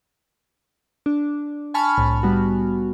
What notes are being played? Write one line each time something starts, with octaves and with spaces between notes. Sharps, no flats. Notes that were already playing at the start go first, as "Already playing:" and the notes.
D4
G#5 A5 B5 C#6 F6
C2 A2
G3 B3 F#4